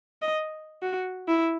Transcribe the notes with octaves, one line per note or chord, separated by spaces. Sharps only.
D#5
F#4
E4